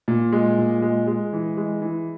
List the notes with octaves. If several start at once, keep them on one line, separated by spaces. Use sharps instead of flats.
A#2
G#3
A#2
G#3
G#3
E3
G#3
E3